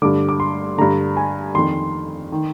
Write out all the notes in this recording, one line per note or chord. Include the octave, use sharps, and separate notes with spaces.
G2 D3 D6
D6
C6
G2 D3 A#5
G#5
F2 D#3 C6
D#3